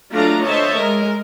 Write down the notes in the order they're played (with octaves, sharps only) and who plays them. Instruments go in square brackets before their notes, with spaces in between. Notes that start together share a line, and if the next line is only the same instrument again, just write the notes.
[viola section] F#3 A3 D4 F4 F5 A#5
D3 C5 C#5 D#5 E5 A5
G#3 A#4